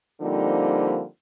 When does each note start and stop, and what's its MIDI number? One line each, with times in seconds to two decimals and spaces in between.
0.21 1.04 50
0.21 1.04 53
0.21 1.04 55
0.21 1.04 58
0.21 1.04 60
0.21 1.04 63